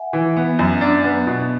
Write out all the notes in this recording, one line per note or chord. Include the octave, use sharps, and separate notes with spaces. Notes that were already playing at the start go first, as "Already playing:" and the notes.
Already playing: E5 F#5 G#5
E3
B3
F#2
D4
B3
B2